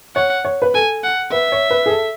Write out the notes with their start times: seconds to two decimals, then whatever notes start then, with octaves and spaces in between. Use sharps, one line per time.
0.16 C#5 F#5
0.45 C#5
0.62 B4
0.74 A4 G#5
1.03 F#5
1.32 B4 E5
1.52 C#5
1.71 B4
1.86 G#4
1.90 A4